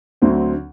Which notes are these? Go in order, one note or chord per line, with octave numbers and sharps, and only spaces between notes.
D2 D3 F#3 C4